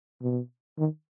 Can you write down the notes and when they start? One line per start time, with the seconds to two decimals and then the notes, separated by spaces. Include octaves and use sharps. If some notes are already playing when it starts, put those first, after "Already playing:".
0.22 B2
0.78 D#3